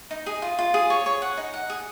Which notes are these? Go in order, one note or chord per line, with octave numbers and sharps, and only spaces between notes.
D#4
G#4
F4
F4
G#4
C#5
C#5
F#5
D#4
F#5
G#4